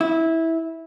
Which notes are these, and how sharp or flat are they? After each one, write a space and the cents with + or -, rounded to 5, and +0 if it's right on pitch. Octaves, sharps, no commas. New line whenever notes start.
E4 -15